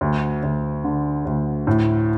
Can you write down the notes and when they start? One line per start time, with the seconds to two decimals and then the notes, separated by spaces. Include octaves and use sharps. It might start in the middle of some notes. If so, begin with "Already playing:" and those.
0.01 D2
0.43 D2
0.84 D3
1.25 D2
1.67 A2